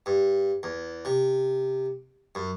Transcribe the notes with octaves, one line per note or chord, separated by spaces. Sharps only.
G2
E2
C3
F#2